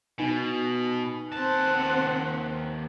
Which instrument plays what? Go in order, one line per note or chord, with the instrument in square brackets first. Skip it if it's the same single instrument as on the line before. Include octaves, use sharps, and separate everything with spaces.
[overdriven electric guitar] B2 [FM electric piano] D#4 B4 G#5
[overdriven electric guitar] D#2 A5 [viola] C4 F#5